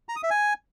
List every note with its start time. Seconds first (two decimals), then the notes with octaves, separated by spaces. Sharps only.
0.09 A#5
0.16 D#6
0.23 E5
0.30 G#5